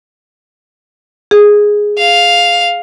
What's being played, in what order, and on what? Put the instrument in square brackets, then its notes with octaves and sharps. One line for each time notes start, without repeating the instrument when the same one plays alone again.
[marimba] G#4
[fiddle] F5